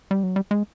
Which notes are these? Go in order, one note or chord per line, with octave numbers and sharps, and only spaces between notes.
G3
F#3
G3
G#3